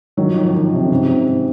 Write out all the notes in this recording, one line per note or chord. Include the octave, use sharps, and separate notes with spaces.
D#3 F#3
F3
D#2
F3
D#2 D#3
D#2 C3
C#3
G#2
C3
G#2
G#2